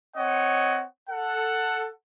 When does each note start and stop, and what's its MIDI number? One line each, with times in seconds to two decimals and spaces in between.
0.16 0.82 60
0.16 0.82 73
0.16 0.82 75
0.16 0.82 78
1.08 1.89 69
1.08 1.89 78